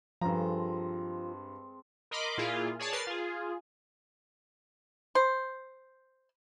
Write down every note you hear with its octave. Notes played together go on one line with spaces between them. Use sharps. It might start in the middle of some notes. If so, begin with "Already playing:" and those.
G2 F3 G#3 C4 A4 A#5
A#4 D#5 B5 C6 D6
A#2 A#3 E4 F4 G#4
G#4 C#5 D5 A5
A#4 B4 A6 C7
F4 G#4
C5